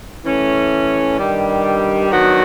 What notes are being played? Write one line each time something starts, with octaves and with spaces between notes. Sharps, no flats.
E3 A3 C#4
G2 D#3 G3
D#3 F#3 B3 D4 F#4